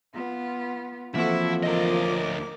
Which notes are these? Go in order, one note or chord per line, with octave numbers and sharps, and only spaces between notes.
B3 F4
E3 F3 A#3 C4 E4 F#4 A4
D2 A#4 D#5 D6